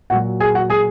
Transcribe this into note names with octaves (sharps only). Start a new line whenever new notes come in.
A#2 F#3 F#4 F#5
G#4 G#5
F#4 F#5
G#4 G#5